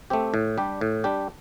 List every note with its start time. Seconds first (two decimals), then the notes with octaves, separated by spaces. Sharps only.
0.10 A3 C4 G4
0.34 A2
0.58 G3 D4 G4
0.81 A2
1.04 G3 D4 G4